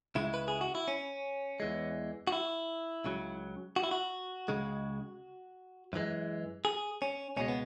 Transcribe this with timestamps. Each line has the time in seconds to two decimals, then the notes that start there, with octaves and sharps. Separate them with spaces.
0.15 C#2 C#3 G#3 E4
0.34 B4
0.48 G#4
0.61 F#4
0.75 E4
0.88 C#4
1.60 E2 E3 G#3
2.27 F#4
2.32 E4
3.05 C#2 C#3 F#3
3.76 F#4
3.83 E4
3.91 F#4
4.48 C#2 C#3 G#3
5.93 F#2 E3 G#3
6.65 G#4
7.02 C#4
7.37 C#2 B2 G#3 C#4
7.48 B3